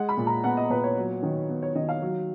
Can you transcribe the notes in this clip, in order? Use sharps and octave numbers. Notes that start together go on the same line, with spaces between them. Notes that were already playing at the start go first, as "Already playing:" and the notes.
Already playing: G#3 F#5
B5
A#2
A#5
B3 F#5
D#5
A#2 B4
C#5
F#3
D#3
B3
C#5
D#3 D#5
F5
F#3